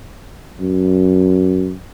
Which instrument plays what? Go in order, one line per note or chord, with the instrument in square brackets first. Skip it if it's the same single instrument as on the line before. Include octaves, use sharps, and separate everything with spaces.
[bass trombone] F#2